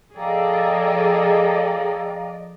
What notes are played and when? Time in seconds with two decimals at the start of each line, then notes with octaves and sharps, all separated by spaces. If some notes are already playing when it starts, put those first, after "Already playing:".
0.17 F3 G#4 A4 D5 D#5 F5 G5 A#5